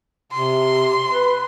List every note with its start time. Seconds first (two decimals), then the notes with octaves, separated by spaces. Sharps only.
0.32 C3 C6
1.11 B4